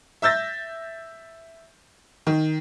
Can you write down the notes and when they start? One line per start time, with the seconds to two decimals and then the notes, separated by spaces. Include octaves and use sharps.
0.22 E5 E6 G6 A6 A#6
2.27 D#3